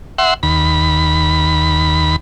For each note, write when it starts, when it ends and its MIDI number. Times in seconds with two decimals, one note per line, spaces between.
0.18 0.34 76
0.18 0.34 78
0.18 0.34 84
0.43 2.16 39
0.43 2.16 83